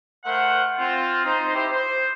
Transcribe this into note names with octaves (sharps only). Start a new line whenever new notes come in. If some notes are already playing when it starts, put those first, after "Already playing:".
A3 A#4 C5 F5 F#5
C4 F4
D#4 C5
E4 G4 C5
C5